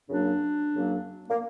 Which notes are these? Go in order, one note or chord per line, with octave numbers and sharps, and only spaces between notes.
F#2 C#3 F#3 A#3 D4
F#2 C#3 F#3 A#3
A#3